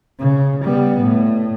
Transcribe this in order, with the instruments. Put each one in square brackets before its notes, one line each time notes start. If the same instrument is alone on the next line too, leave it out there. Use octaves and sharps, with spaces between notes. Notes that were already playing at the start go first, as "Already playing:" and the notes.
[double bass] C#3
G3 B3
A2